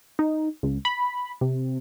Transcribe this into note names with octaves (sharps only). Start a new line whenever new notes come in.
D#4
C#2
B5
C3